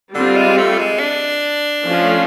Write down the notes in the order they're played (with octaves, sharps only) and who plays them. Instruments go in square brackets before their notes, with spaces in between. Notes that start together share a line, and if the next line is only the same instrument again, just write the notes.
[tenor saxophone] D3 [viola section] G3 C4 F4
[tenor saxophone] G#3
A3
G#3
D4
[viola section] F3 A3 C#4 F4